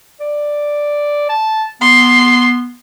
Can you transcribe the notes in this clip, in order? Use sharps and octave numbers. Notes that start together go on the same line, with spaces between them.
D5
A5
B3 C6